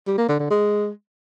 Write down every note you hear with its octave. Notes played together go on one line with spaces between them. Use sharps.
G3
A#3
D3
D3
G#3